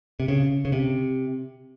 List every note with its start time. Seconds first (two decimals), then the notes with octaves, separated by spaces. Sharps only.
0.20 C3
0.28 C#3
0.65 C#3
0.72 C3